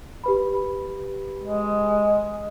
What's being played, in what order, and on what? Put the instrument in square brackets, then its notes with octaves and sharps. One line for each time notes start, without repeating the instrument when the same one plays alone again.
[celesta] G4 B4 B5
[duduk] G#3